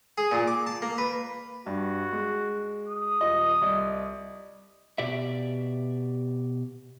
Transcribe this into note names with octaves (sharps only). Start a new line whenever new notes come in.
G#4
A#2
D6
A5
A#3
B4
G2 F#4
G#3
D#6
D#1 F4 D#5
C2 D#5
B2 G4 D5 E5